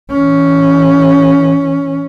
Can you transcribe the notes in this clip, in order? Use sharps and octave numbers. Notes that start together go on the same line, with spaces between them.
E3 C#4